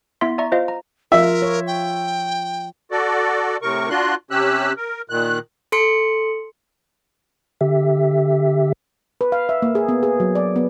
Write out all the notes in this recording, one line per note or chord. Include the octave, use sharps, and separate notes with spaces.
B3 E4 E5 C6 B6
D5 E5 A#5 C#6
F4 C5 D#5 F5
A#5
F3 F4 A#4 E5
C#5
G5
F#4 A4 D5
A2 C3 A#4 C#6
D4 F4 F#4 C6 F#6
C3 C#4 G4 E6 F#6
A#4
A#2 D#3 F#6
A4 C6 C#7
D3 G4 E5
B4
F5
E5
A#3
G#4
B3
G#4
F#3
D5
B3